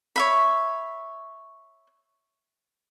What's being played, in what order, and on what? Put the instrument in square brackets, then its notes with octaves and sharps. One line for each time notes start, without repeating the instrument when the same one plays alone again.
[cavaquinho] C#5 E5 B5